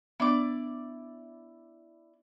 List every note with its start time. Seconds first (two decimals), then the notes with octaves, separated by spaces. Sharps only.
0.20 B3 D4 E4 D5 D6